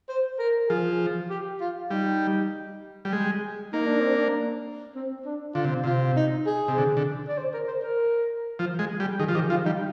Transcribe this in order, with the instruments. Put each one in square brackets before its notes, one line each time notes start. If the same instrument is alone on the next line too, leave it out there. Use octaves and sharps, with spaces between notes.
[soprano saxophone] C5
A#4
[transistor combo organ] F3 [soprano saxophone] G#4
[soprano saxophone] G4
F4
[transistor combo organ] G3 [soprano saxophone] D#4
[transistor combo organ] G3
G#3
[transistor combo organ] A#3 [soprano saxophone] D#4
[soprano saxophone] D4
C4
D4
C4
D4
[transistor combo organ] D3 [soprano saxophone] F4
[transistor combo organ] C3
[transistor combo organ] C3 [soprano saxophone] F4
[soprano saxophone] D#4
G#4
[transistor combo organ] C3
D3
D3
[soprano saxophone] D5
C5
A#4
C5
A#4
[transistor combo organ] F3
G#3
G3
[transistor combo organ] D#3 [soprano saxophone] G#4
[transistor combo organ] F3
[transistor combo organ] D#3 [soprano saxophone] G4
[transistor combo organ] F3 [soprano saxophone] F4
[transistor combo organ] G3 [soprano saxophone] D#4